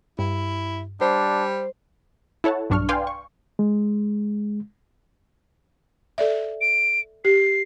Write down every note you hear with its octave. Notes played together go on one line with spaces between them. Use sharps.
G2 E4
G3 D4 C5
E4 A4 C#5 F#5 A5
B1 G2 D4 C#6 F6
B4 D5 F5 G5 G#5 C6
C#6
G#3
A4 D5 E5
D7
G4 C7